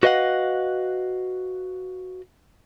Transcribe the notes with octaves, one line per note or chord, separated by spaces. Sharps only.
F#4 B4 D#5 F5 F#5